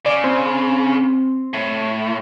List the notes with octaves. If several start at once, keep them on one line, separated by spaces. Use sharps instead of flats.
C#3 D5
C4
A2